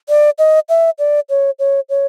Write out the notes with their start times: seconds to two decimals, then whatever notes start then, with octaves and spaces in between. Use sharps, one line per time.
0.09 D5
0.38 D#5
0.69 E5
0.99 D5
1.30 C#5
1.59 C#5
1.90 C#5